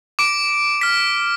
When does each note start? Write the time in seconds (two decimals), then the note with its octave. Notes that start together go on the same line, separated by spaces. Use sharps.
0.19 D6 D7
0.81 F6 B6